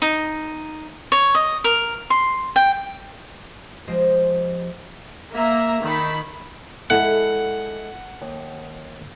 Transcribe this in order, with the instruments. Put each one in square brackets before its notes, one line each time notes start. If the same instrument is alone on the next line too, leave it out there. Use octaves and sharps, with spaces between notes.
[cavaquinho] D#4
C#5
D#5
A#4
C6
G5
[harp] F3 G#3 G4 C5 D#5
[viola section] A#3 E5 A#5
D#3 B5
[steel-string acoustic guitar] G#3 E4 A4 [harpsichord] F#5
[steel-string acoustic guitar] D#2